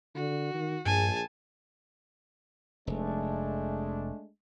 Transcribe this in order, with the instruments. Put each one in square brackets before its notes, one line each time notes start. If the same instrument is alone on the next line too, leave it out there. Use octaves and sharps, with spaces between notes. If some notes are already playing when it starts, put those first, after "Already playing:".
[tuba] D3 [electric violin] F#4
[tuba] D#3
[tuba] A#1 [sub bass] G2 [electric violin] G#4 A5 [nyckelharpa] G#5
[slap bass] F1 [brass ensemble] G#3 A3 D4